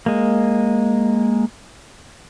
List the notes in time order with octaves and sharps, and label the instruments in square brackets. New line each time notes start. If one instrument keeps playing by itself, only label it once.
[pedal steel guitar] G#3 A#3